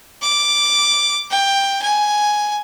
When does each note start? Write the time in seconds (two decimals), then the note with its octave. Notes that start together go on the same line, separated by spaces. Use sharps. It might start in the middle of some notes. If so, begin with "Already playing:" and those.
0.22 D6
1.31 G5
1.82 G#5